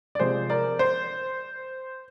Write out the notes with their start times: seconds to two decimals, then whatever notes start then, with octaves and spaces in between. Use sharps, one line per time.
0.15 D5
0.20 C3 F3 G#3 C5
0.50 A#4 D5
0.79 C5